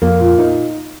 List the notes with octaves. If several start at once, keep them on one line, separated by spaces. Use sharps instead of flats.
F2 A#3
A#2
D#4